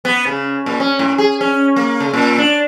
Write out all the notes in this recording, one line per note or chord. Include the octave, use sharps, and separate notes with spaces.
B3
C#3
A#2
C#4
A2
G#4
C#4
A#3
C#3
A#2
D4